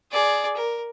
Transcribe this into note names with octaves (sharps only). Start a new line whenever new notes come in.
G#4 D5
A#4